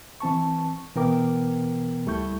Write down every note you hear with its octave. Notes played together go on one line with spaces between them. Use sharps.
E3 C4 A5 C#6
B2 E3 B3 A#4 G5 D6
C#2 G3 A3 E4 C#6 G6